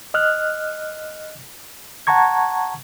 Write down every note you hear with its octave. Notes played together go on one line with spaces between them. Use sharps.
D#5 F6 F#6
F#5 A5 A#5 C#6 G#6